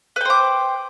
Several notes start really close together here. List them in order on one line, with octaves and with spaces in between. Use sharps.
B4 G5 C5 D6